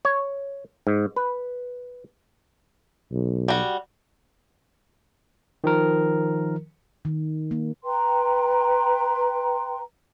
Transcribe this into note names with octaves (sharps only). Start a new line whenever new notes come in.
C#5
G#2
B4
B1
G3 F#4
D#3 F3 A#4
D#3
A#3
B4 G5 A#5 C6